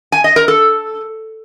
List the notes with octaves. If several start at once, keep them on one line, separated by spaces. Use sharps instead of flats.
G#5
D#5
A#4
A4